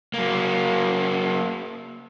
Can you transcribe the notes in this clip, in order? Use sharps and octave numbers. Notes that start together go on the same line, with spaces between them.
F#3 A#3